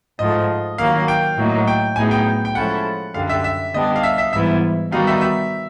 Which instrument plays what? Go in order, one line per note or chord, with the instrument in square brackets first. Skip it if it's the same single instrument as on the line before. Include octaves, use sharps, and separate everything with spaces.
[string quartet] G#2 F3 A3 [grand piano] D#5
[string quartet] D#3 F#3 A#3 [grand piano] F5
[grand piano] G5
[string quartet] A2 F#3 A#3 D#4
[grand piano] G5
[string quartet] A2 F#3 B3 D#4 G#4 [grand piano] G#5
[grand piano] G5
G5
[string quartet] F3 G#3 C#4 E4 A4 [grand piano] F#5
[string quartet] F#2 D3 G3 [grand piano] F5
[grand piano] E5
E5
[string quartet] D3 G3 B3 D4 G4 [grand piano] D#5
[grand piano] F5
E5
E5
[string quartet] G#2 E3 G3 B3 E4 [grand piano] E5
[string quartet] D#3 G3 B3 D#4 F#4 [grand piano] F5
[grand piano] E5
E5